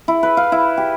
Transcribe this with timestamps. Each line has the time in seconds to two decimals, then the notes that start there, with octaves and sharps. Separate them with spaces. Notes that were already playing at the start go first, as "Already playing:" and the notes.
0.08 E4
0.23 B4
0.37 F5
0.52 E4
0.77 G4